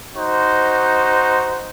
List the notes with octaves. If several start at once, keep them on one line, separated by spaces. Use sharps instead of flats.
D#4 F#4 C5